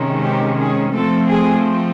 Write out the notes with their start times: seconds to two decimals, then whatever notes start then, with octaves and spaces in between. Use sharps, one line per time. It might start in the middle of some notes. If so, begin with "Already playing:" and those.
Already playing: C3 D#3 G#3 C#4
0.22 G4
0.58 G#4
0.93 F3 A3 C4 A4
1.29 G#4